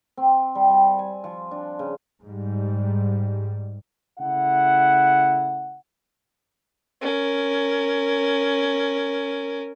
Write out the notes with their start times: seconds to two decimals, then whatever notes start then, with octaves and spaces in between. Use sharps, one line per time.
0.17 C4
0.55 G3
0.70 G3
0.99 G#5
1.24 F3
1.51 D4
1.79 C#3
2.23 G#2 G3
4.19 C#3 A3 E4 F#5
7.01 C#4 A#4